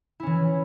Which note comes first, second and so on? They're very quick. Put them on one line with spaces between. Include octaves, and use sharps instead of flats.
E4 C#4 E3